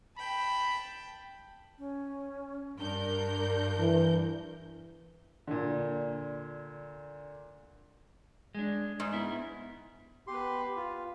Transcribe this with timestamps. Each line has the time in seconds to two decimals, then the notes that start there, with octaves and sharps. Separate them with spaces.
0.18 G5 A5 B5
1.78 C#4
2.78 G2 D4 A#4 G6
3.79 E3
5.47 A#2 D3
8.55 G#3 D4
9.00 G#2
9.13 B3 E4
10.27 B3 G4 B4 C6
10.76 F4